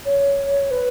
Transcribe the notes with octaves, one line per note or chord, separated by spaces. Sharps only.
C#5
B4